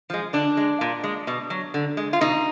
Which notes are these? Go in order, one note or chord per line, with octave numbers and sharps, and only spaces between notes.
F3 G#3
D3 D4
G#3
A#2
G#3
B2
F#3
D3
G#3
F4
B2 D#4